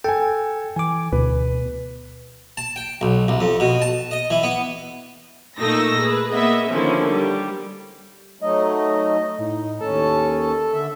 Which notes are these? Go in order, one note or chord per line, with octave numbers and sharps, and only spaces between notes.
A4 G5 G#5
E3 G#5 D6
D2 B2 B4
A5
G5
B1
C2
F2
B2
A5
D#5
E3
B3
A#2 A3 D#4 C#6 E6 A#6
G#4 B4
A#3 B3 G#4 D#5 E5
D3 D#3 F3 A#3 C#4 E4
G3
F#3 A3 D#4 D#5
A2 D#4
D#2 C#4 A4 A5
D3 E5